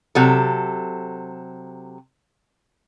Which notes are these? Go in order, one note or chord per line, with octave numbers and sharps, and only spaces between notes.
C3 F#3 A4